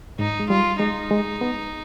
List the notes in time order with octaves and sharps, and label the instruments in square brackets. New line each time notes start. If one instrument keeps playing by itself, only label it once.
[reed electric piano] G#2 [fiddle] D#4
[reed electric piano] G#3
[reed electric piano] G3 [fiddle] F4
[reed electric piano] G#3 [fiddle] D#4
[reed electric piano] G#3
B3